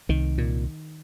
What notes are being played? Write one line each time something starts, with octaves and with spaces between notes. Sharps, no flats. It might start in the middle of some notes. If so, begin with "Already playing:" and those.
C2 D#3
A#2